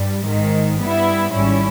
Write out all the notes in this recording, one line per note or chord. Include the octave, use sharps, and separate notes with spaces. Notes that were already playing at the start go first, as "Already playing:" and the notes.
Already playing: G2 G3
G#1 G#2 D#3
G2 G3 B3 E4
G#1 G#2 G3 C#4 E4